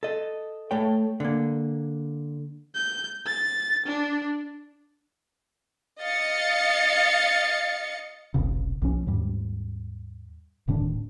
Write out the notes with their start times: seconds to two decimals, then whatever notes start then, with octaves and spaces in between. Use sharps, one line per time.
0.03 A4 D#5
0.71 A3 A4 C#5 G5
1.20 D3 A#3
2.74 G6
3.26 A6
3.86 D4
6.00 D#5 F5 A6 C#7
8.34 F1 B1 C#3
8.82 B1 F3 C#4
9.07 D#2 G#2 G3
10.68 D1 A2 D#3 D4